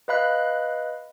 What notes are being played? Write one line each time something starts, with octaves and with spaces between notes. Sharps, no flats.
B4 D#5 F5 B5 F#6